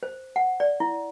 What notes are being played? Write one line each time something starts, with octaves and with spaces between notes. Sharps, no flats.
C5
F#5
D5
E4